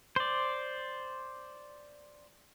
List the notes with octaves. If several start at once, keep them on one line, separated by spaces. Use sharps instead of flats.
C5 D5